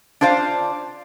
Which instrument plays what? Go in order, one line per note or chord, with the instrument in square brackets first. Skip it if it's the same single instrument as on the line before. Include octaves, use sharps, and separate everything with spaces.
[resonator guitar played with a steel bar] D4 F4 C5 D5 F5